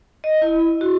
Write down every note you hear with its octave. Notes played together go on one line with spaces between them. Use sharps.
D#5
E4
F#4